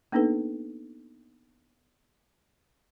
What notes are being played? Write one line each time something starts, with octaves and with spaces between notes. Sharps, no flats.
A#3 B3 D4 D#4 A4 B4